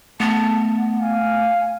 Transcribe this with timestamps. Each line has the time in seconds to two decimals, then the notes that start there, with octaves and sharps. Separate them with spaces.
0.20 A3 B3 A5
1.01 F5 G#5